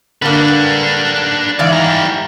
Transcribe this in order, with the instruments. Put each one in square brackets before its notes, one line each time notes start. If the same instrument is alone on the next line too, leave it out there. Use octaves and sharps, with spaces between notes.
[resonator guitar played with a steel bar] D3 A#3 [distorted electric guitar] D4 B4
[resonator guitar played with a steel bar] G#2 E3 F5 [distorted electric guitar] D5
[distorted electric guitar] G3 A#5